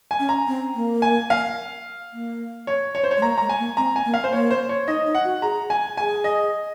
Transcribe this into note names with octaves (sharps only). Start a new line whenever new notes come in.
G#5
C#4
A#5
C4
A#3
G#5
F5
A#3
C#5
C#5
C5
C#5
G#3
A#3 A#5
G#3 A#5
G#5
A#3
C4 A#5
G#5
A#3
F5
C5
A#3 C#5
C5
C#5
D#4 D#5
D#4
F#5
F#4
G#4 A#5
G#5
G#4 G#5
D#5